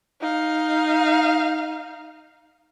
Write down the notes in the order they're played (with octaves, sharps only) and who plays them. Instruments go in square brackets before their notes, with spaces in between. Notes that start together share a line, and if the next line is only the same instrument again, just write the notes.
[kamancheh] D#4 F5